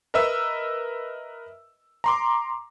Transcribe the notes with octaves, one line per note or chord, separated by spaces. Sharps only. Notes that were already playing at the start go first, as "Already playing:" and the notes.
A#4 B4 D#5 E5 E6
A#5 C6 D6